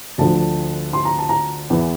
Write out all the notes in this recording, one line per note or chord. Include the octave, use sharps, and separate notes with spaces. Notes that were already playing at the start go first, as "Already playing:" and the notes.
D2 D3 F3 A5
C6
A#5
A5
A#5
E2 E3